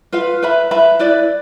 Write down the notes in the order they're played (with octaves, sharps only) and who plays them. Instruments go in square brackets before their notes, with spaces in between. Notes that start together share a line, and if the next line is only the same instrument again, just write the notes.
[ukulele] F4 B4 F5
B4 E5 B5
B4 E5 B5
E4 B4 D5